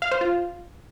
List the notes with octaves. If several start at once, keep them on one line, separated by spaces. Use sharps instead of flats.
F5
C5
F4